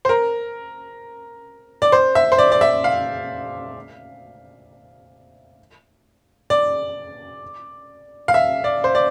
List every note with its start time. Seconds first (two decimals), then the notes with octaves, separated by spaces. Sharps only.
0.05 C5
0.09 A#4
1.82 D5
1.92 C5
2.15 E5
2.32 C5
2.38 D5
2.52 D5
2.61 E5
2.84 F5
6.50 D5
8.28 F5
8.34 E5
8.64 D5
8.84 C5
8.95 D5